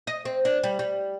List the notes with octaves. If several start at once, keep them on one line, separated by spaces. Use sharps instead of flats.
D#5
C4
D4
G3
G3